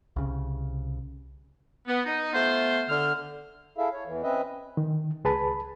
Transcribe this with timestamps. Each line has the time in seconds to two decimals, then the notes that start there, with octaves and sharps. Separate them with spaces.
0.16 C2 C#3
1.88 B3
2.06 D#4
2.33 A3 B3 F4 C5
2.89 D3 F6
3.78 E4 G#4 A4 E5 F5
3.93 C#5
4.07 E2 E3
4.23 C4 C#4 B4 D#5 E5
4.77 D#3
5.24 C#2 G#4 B4 A5 B5